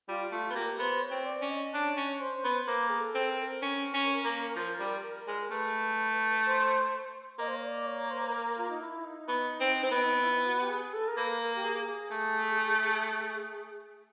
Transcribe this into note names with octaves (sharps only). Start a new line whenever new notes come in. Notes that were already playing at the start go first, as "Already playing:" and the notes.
G3 F4
A3 F4
B3
A#3 G4
B3 C5
C#5
C4
D5
C#4
D#5
D4 C#5
C#4
C5
B3
A#3 B4
G#4
A4
C4
A#4
A4
A#4
C#4
C#4
A#3
F3
G3
G#3
A3 B4
C5
A#3 D#5
C5
C#5
D5
C#5
C5
B4
A#4
F4
D#4
E4
D#4
B3
C4
C4
B3
E4
F#4
G4
G#4
A4
A#4
A#3 B4
A#4
G4
G#4
G#4
A3